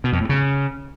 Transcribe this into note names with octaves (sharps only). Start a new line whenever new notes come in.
B2
F2
A2
C#3